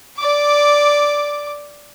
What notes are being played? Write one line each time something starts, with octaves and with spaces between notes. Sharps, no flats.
D5 D6